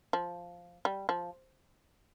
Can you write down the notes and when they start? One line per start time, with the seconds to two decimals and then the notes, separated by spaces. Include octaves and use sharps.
0.13 F3
0.85 G3
1.09 F3